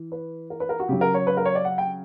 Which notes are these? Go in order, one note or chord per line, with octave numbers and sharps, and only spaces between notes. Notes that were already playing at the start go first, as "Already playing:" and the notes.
Already playing: E3
B4
A#4
B4
A#4
F#4
C#3 F#3 G4
A#4
C#5
B4
A#4
C#5
D5
F#5
G5